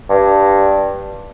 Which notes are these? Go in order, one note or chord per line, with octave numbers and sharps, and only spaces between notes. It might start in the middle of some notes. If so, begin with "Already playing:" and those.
G2